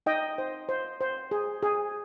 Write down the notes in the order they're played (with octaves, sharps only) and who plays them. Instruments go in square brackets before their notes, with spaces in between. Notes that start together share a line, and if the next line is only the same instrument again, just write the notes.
[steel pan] D#4 D#5 G5
C5
C5
C5
G#4
G#4